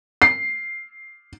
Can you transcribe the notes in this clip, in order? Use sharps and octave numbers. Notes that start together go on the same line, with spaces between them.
C7